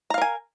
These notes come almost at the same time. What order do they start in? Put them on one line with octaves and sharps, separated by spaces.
A#5 F5 A#4 G#5